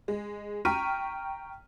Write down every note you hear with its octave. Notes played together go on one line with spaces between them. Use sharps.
G#3
G5 A#5 C#6 F6 B6 D#7